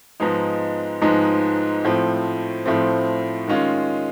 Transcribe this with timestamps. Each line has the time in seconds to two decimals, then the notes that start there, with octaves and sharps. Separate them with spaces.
0.20 G#2 F3 G#3 B3 D#4
1.01 G#2 F3 G#3 B3 D#4
1.84 A2 F3 A3 C4
2.66 A2 F3 A3 C4
3.48 D#3 G#3 C#4 F4